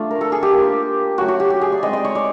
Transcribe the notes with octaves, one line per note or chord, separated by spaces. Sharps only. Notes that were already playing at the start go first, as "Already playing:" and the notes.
Already playing: A3 D4 F4
A#4
A4
G#4
G4
A#3 D4 F4
F#3 A3 C#4 F#4
F#4
G4
G4
G#4
D5
G#3 C4 D#4 D#5
D5
C#5
D5